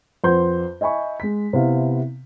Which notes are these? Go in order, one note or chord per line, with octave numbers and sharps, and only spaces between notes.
F2 B4 C5 F#5 C6 G6
D#5 E5 G#5 B5 C#6
G#3 B6
C3 B3 E4 F5